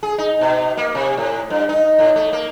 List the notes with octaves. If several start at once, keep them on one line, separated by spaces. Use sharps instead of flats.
G#4
D#4
B2
A#3
C3
A2
G2
D#4
A2
A3
A#3